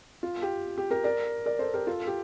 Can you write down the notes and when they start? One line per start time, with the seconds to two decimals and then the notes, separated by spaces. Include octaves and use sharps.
0.23 F4
0.42 G4
0.78 G4
0.90 G4 A#4
1.04 A#4 D5
1.46 A#4 D5
1.59 A4 C5
1.74 G4 A#4
1.87 F4 A4
2.07 G4